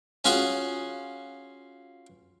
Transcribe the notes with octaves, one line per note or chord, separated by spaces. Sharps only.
C#4 F4 F#4 G#4 C#5